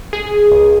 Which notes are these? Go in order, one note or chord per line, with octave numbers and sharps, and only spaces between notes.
G#4
C#2